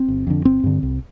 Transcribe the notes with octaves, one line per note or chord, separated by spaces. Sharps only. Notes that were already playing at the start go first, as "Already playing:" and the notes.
Already playing: C4
G1
F2 D3
G1 C4
G2 D3
C2